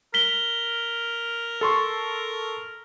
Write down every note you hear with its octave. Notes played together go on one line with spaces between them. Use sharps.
A#4 B6 G7
A4 C6 C#6